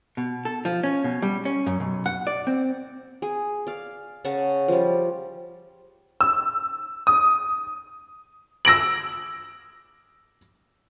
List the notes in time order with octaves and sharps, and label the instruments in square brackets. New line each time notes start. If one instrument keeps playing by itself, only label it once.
[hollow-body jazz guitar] B2
A4
F3
C#4
B2
G3
C#4
F#2
B1
F#5
D5
C4
[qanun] G#4
D5 F5
C#3 F#5 A5 C#6
F3 G3
[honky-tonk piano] E6
D#6
[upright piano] E6 A#6 D7 F#7